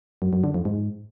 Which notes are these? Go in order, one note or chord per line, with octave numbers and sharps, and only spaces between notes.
F#2
F#2
D3
F2
G#2